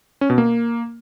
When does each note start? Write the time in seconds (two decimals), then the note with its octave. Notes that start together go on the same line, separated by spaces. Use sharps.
0.21 C#4
0.30 B2
0.38 A#3